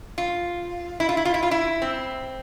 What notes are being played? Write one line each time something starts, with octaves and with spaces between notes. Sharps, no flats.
F4
E4
F4
E4
F4
E4
F4
E4
C4